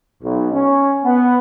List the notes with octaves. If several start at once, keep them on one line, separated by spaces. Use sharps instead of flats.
B1
C#4
B3